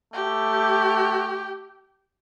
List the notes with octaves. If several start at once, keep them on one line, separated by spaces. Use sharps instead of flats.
A3 G4